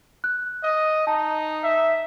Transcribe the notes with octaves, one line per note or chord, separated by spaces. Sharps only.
F#6
D#5
D#4 A5
E5